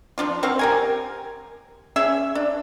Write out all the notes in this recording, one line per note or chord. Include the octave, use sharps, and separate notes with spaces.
F3 D4 F4
C4 F#4 C5 F5
G4 A#4 G#5
C#4 G#4 E5
D4